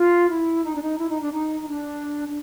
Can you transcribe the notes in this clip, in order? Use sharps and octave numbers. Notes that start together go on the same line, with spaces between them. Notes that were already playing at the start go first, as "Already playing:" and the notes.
Already playing: F4
E4
D#4
D4
D#4
E4
D#4
D4
D#4
D#4
D4
D4